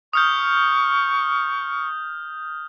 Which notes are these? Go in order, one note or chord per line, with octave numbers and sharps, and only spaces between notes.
C#6 D#6 F6 G6